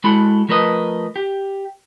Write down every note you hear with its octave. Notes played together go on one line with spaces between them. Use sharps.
G#3 E4 F#4 A4 B5
F3 A3 A#4 B4 D#5
G4